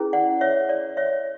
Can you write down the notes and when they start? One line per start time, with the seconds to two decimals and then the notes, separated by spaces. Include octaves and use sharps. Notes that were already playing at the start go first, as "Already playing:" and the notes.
Already playing: C#4 E4 G#4 B4
0.13 D5 F#5
0.41 C#5 E5
0.69 D5
0.97 C#5 E5